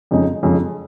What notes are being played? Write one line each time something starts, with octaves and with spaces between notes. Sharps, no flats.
F2 C#3 G#3 D#4
F2 C#3 G#3 D#4